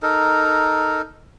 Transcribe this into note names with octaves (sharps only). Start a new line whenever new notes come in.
D#4 A4 A#4